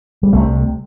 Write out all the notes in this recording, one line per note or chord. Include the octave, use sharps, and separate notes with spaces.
G3
C2 C3 A3